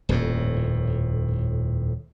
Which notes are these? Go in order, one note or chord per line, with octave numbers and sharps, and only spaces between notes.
D#1 F2 A2